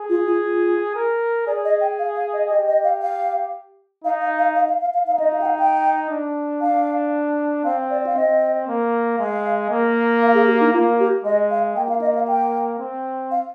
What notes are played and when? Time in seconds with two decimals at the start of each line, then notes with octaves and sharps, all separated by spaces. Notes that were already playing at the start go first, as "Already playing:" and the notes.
Already playing: G#4
0.10 F4
0.27 F4
0.44 F4
0.95 A#4
1.47 G#4 D5
1.65 D#5
1.81 G5
1.99 F5
2.16 F5
2.33 D#5
2.49 G4 D#5
2.68 D#5
2.84 F5
3.01 F5
4.04 D#4 F5
4.21 F5
4.39 F5
4.56 F5
4.69 F5
4.81 F5
4.94 F5
5.07 D#4 F5
5.20 D#5
5.33 F5
5.41 G5
5.46 F5
5.59 G5
6.10 D4
6.61 D4 F5
7.64 C4 F5
7.90 D5
8.06 F5
8.16 C4 D#5
8.68 A#3
9.19 G#3 F5
9.71 A#3
10.22 F5
10.34 G#4
10.47 G4
10.60 D#4
10.73 A#3 F4
11.00 G4
11.24 G#3 D#5
11.51 F5
11.76 A#3 G5
11.89 F5
12.01 D#5
12.15 F5
12.28 G5
12.79 C4
13.31 F5